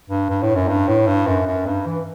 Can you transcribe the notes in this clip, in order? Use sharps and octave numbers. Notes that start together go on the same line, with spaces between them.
G2
G2
A2
F#2
G2
A2
G2
F#2
F#2
G2
E3